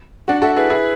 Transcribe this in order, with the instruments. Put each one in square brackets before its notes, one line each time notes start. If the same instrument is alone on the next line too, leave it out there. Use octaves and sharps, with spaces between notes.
[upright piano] D4 F#4 [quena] F#5
[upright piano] F#4 A4 [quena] E5
[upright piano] E4 G#4 [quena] B4
[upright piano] E4 G#4